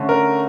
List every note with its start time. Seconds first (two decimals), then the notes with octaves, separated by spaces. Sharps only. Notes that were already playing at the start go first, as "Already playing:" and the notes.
Already playing: D3 A3 C#4
0.09 A#4